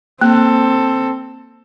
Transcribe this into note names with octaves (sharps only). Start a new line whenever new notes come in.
A#3 C4 A4